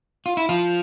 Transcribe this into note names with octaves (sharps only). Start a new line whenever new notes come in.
F4
E4
F3 F4